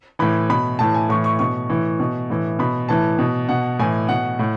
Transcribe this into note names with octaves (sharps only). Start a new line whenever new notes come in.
A2 E3 B5
B2 B5
A2 E3 A5
G#5
A2 E3 C#6
C#6
B2 C#6
A2 E3
B2
A2 E3
B2 B5
A2 E3 A5
B2
B2 F#5
A2 E3 G#5
B2 F#5
A2